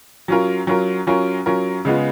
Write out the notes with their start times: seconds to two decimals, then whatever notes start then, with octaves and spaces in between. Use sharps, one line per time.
0.28 F#3 C#4 F4 A#4
0.67 F#3 C#4 F4 A#4
1.07 F#3 C#4 F4 A#4
1.46 F#3 C#4 F4 A#4
1.85 C#3 G#3 B3 F4